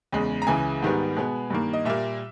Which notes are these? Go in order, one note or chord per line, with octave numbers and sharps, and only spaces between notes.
E2 C#3 G#3
A#5
C#2 C#3 E3 G#5
G#2 D#3 G3 B3
B2 G#3 B3
G2 D#3 A#3
D#5
A#2 G3 A#3 E5